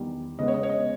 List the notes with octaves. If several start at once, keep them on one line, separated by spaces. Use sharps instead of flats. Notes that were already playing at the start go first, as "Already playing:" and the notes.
Already playing: E2 D#3 G3
C#3 G#3 B3 D#5
C#5
D#5
C#5
D#5